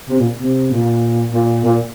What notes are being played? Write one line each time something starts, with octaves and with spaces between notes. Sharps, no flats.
C3
A#2
C3
A#2
A#2
A#2